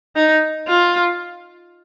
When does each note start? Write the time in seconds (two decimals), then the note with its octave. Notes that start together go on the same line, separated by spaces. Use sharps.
0.16 D#4
0.68 F4